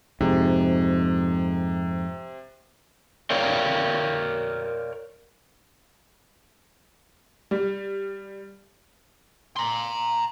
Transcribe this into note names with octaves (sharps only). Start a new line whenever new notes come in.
F2 G#2 C3
A#4 C#5 D5 F5 G5
G3
A#5 C6